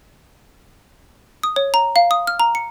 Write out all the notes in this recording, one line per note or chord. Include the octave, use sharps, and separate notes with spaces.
D#6
C#5
A#5
F5
D#6
F6
A#5
C#7